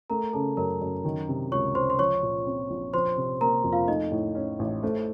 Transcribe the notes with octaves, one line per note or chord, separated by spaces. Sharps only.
A3 A#4 A#5
C#3 A4 A5
F#2 A#4 A#5
F#2
D#3
C3
C#2 C#5 C#6
C#2 C5 C6
C6
F3 C#5 C#6
A#2
C4
A#1
F3 C5 C6
C3
A#3 A#4 A#5
F2
F4 F5
A3 D#4 D#5
A2
C#4
A1
A3 C5